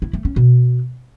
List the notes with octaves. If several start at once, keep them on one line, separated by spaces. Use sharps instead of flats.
E4
A3
C#4
B2